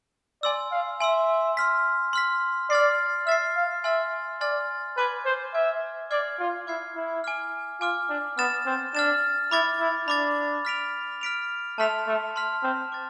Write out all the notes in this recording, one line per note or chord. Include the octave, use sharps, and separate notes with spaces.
D5 G#5 C6 E6
F5
E5 G#5 C6 E6
C6 F6 B6
C6 F6 B6
D5 F6 A6 C7
E5 F6 A6 C7
F5
E5 G#5 C6 F6 A6
D5 G#5 C6 F6 A6
B4 G#5 D6 F6 G#6
C5
E5 G#5 D6 F6 G#6
D5 D6 F6 G#6 C7
F4
E4 D6 F6 G#6 C7
E4
G#5 D6 F6
F4 G#5 D6 F6
D4
B3 F6 A6 E7
C4
D4 F6 A6 E7
E4 B5 D6 A6
E4
D4 B5 D6 A6
F6 B6 D7 F7
F6 B6 D7 F7
A3 A5 C6 F6 B6 F7
A3
A5 C6 F6 B6 F7
C4
D6 A6